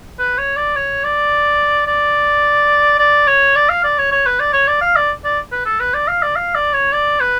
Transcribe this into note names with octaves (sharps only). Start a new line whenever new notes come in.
B4
C#5
D5
C#5
D5
D5
D5
C#5
D5
F5
D5
C#5
C#5
B4
D5
C#5
D5
F5
D5
D5
B4
A4
B4
D5
F5
D5
F5
D5
C#5
D5
B4